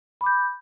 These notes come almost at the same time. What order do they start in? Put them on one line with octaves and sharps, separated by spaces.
B5 D6 G6